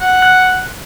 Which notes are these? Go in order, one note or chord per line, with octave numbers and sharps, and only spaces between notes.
F#5
F#6